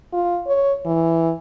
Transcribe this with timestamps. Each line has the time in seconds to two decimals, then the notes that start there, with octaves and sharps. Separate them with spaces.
0.13 F4
0.46 C#5
0.86 E3